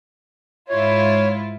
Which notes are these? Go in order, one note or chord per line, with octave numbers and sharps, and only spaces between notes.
G#2 E4 F4 C#5